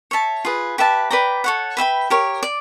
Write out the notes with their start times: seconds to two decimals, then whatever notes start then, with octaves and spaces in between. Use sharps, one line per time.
0.11 C#5 E5 A5
0.45 F4 G#4 B4
0.78 G4 B4 E5 A5
1.11 B4 D5 G5 A#5
1.44 A4 C#5 F#5
1.77 B4 E5 G5 B5
2.10 G4 A#4 C#5
2.43 D5